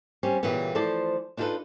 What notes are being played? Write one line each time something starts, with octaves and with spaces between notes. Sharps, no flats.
G3 C4 C#4
A#2 C#3 E3 G3 A#3 B3
E3 F3 A3 A4 C5 D5
D4 D#4 F4 G4 A4 B4